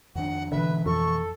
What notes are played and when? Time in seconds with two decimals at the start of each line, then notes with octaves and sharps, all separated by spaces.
0.15 F2 D#3 D4 F#5
0.52 A1 B2 D3 E3 B4 E5
0.86 F2 A4 C#6